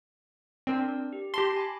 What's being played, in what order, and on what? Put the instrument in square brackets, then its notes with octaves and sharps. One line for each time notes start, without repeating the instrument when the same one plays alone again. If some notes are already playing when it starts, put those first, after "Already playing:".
[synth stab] C4 [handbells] D4 A#4 D5
[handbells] D5
G4
[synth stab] G4 C6 [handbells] A5 B5 A#6
[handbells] G#5 B5 D6